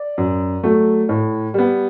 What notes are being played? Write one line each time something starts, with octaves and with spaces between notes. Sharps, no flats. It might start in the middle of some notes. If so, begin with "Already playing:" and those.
Already playing: D5
F#2
F#3 A3
A2
G3 B3